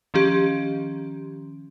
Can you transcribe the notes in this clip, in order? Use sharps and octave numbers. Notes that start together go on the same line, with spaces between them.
D#3 F3 C#4 G4